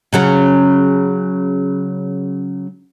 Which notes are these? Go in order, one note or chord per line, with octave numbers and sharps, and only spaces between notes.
C#3 F#3 C#4